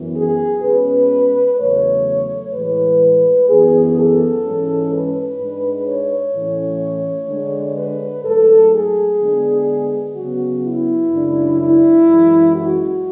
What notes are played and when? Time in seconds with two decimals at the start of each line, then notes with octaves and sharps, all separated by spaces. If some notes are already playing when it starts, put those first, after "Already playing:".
Already playing: F#2 E3 B3
0.15 G#4
0.63 B2 G#3 C#4 B4
1.58 E2 C#3 F#3 A3 C#5
2.53 A2 E3 G#3 B4
3.48 F#2 E3 B3 G#4
3.96 A4
4.44 G#2 E3 G#3 C#4
4.91 B4
5.39 G#2 G#3 D4
5.86 C#5
6.34 A2 E3 A3 C#4
7.29 D3 G#3 D4
7.77 B4
8.25 G#2 F#3 A3 A4
8.73 G#4
9.20 D3 G#3 B3 D4
10.15 C#3 F#3 B3 F#4
10.63 E4
11.10 F#2 C#3 G#3 D4
11.58 E4
12.06 F#2 E3 G#3
12.54 F#4